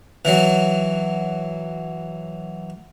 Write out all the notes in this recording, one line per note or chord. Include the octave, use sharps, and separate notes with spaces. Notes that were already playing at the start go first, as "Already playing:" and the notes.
E3 F#3